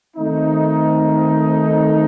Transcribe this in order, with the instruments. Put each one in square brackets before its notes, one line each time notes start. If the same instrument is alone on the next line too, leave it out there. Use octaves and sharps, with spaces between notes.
[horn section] D#3 A3 C4 D#4